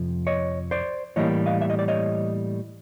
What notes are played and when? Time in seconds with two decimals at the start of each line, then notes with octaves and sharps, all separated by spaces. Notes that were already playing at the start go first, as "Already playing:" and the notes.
Already playing: F2 C3 F3
0.27 C#5 D#5
0.71 C5 D5
1.16 A2 E3 G3 A#3 C#5 D#5
1.46 D#5 F5
1.61 E5
1.70 D#5
1.79 D5
1.88 C#5 D#5